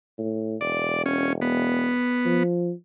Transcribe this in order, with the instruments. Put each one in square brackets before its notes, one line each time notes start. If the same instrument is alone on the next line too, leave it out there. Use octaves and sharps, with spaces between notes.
[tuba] A2
[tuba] E1 [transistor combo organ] D5
[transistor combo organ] C#4
B3
[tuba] F3